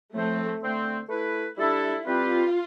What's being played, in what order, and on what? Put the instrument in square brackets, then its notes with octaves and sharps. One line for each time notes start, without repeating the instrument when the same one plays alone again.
[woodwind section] A2 F3 C4 [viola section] A3
[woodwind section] D3 A3 C4
A3 E4 B4
[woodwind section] G3 D4 A4 [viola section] E4
[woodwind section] G3 C4 G4 B4 [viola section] F4